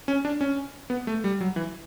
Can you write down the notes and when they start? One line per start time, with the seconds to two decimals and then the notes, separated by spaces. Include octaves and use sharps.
0.08 C#4
0.25 D4
0.41 C#4
0.90 B3
1.07 A3
1.24 G3
1.41 F#3
1.56 E3